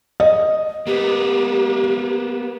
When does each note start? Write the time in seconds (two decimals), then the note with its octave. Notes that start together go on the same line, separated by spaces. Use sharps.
0.20 D#5
0.87 A#3 B3 G4